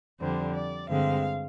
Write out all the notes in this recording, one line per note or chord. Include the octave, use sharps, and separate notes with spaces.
F2 D3 G3 C5
D5
G2 D3 G#3 C4 F5